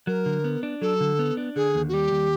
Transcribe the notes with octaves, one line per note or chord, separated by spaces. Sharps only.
F#3 A#4
D3
B3
D4
F#3 A4
D3
B3
D4
D3 G#4
D#2
F#4
G3 G4
D#2